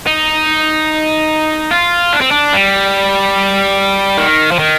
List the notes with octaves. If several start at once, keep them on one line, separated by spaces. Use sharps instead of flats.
D#4
F4
D4
C4
D4
G3
D#3
F3
D#3